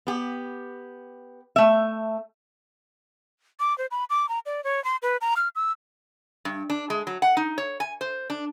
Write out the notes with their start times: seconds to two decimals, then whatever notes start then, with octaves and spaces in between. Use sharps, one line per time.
0.07 B3 G4
1.56 A3 E5
3.60 D6
3.78 C5
3.91 B5
4.10 D6
4.29 A#5
4.46 D5
4.64 C#5
4.84 C6
5.02 B4
5.21 A#5
5.37 F6
5.55 E6
6.45 G2
6.70 D4
6.90 G#3
7.07 F#3
7.22 F#5
7.37 D#4
7.58 C#5
7.80 G#5
8.01 C5
8.30 D4